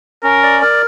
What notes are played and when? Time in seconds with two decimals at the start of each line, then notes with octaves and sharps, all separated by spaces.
0.23 C#4 A#4
0.43 D5
0.62 A#4